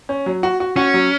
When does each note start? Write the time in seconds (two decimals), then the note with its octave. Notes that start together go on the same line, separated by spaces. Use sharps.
0.09 C#4
0.26 F#3
0.43 F#4
0.60 F#4
0.76 C#4 F#4
0.94 F#3